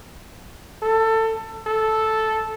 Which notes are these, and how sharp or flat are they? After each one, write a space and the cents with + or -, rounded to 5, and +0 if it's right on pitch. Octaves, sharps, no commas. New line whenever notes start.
A4 +20
A4 -5